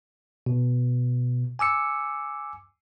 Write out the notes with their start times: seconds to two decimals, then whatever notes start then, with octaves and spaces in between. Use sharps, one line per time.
0.46 B2
1.59 G#5 D6 E6 C#7